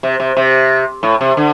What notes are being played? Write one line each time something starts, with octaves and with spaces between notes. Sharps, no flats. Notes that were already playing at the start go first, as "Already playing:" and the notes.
C3
C3
C3
A2
C3
D3